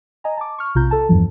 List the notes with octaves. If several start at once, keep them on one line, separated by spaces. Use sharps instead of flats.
D#5 G#5 A#5
A5 D6
C#6 F6
B1 C3 F4 A#5 G6
A4 A5
E2 G2 E3 F3